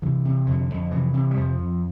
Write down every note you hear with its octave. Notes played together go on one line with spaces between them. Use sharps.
C3 E3
C3
F2 D3
F2
C3 E3
C3
G3
F2 F3
F2